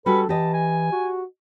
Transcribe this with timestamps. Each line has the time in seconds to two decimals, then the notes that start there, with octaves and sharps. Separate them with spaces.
0.06 G3 C#4 F#4 A4 B4
0.29 E3 G4 D#5 A5
0.54 G#5
0.92 F#4